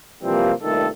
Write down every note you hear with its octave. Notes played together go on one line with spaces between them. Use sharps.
C3 E3 F3 G3 A#3 C4
C2 G2 A#2 D#3 A3 A4